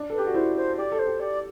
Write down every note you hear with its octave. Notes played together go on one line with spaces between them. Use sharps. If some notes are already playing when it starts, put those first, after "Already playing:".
Already playing: D4
A4 B4
G4
F#4
E4 C5
C5
G4 D5
A4
C5
G4
G4 D5